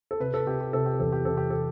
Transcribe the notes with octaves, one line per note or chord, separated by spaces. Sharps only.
A4
C3 B4
A4
C3 G4
G4
C3 A4
G4
E2 A4
G4
C3 A4
G4
A4